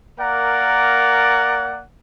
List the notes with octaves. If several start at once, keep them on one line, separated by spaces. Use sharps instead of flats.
A#3 A#4 D5 F#5